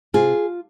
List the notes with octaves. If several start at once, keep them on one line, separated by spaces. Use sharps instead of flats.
C3 F4 G#4